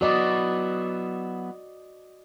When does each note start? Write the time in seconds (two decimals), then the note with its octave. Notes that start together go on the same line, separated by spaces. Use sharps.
0.01 F#3 B3 E4 F#4 D5 D#5